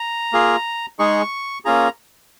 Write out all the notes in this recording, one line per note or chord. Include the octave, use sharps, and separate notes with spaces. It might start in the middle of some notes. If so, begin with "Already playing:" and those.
Already playing: A#5
A#3 F4 G#4
G#3 D#4 G#4 C#6
A#3 C#4 F4 G#4 A#5